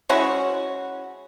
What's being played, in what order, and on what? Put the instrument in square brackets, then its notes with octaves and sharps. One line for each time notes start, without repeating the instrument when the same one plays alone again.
[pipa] G#3 C#4 E4 F#4